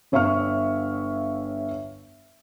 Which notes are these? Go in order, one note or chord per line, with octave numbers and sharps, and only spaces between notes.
G1 C#5 E5 F5 C#6 F6